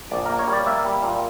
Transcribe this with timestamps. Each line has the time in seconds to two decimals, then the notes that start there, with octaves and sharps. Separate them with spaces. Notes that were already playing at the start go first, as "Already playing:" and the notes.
0.11 A#1 D5
0.26 A#3 A#4
0.39 C#5
0.47 G3
0.53 D5
0.66 A#3 E5
0.85 G3
1.02 A#2